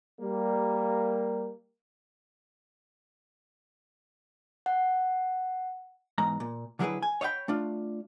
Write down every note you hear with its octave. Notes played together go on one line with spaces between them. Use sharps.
G3 A#3
F#5
E2 G#2 A#5
A#2
D3 F#3 G3 E4 G#4 B4
G#5
C#5 D#5 F5 G5 B5
A3 D4 F4